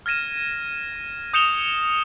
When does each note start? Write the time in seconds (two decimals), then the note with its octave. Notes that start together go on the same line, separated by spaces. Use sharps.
0.06 F6 G#6 A#6 D#7 E7
1.34 D#6 G6 C#7 E7 F7 G7